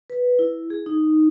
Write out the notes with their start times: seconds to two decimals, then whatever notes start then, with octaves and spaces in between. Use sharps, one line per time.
0.10 B4
0.39 E4
0.70 G#4
0.86 D#4